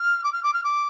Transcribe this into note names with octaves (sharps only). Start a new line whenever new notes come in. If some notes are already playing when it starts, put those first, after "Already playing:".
Already playing: F6
D6
F6
D6
F6
D6